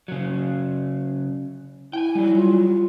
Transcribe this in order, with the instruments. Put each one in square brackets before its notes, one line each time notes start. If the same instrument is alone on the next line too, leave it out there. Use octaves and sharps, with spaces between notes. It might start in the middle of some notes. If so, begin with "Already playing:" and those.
[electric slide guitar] C#3 F#3
[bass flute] E4 [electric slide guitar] G5 G#5
[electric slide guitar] F#3 G3
[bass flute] F4